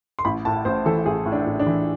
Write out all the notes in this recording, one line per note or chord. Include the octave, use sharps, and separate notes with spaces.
C6
A1 B5
A2 A5
A1 C5
E3 A4
A1 G#4
A2
D4
A1
D4
E3